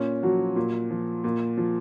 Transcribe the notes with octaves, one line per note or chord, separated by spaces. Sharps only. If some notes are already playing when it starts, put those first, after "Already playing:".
Already playing: A#2 C#4
F3 F#3 F#4
A#2
F3
A#2
F3